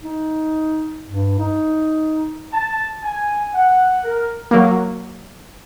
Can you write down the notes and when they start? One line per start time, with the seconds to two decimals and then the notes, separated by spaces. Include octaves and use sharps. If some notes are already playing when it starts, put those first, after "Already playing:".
0.03 D#4
1.08 G2
1.39 D#4
2.53 A5
3.03 G#5
3.55 F#5
4.04 A#4
4.51 F#3 A#3